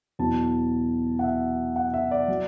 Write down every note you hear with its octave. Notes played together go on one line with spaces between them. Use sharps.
E2 B2 F#3 A5
F#5
E5
F#5
E5
D5
F#3